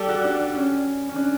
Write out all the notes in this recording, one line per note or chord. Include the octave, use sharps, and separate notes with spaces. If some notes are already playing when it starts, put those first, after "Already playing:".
Already playing: G3 G4 A4
F#4
D4
C#4
C#4
D4